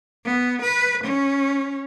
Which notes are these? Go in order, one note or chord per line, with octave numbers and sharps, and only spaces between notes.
B3
B4
C#4